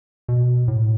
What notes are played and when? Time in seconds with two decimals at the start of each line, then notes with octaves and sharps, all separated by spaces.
0.29 B2
0.68 A2